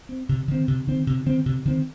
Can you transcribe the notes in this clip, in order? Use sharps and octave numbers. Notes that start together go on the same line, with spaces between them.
C4
C3
D#3 C4
C3
D#3 C4
C3
D#3 C4
C3
D#3 C4